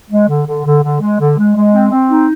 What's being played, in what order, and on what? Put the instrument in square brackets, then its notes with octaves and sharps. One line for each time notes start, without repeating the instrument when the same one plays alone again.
[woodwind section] G#3
D3
D3
D3
D3
G#3
D3
G#3
G#3
C4
C4
D#4